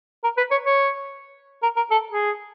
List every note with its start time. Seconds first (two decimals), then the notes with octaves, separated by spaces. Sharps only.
0.23 A#4
0.37 B4
0.51 C#5
0.65 C#5
1.63 A#4
1.76 A#4
1.91 A4
2.12 G#4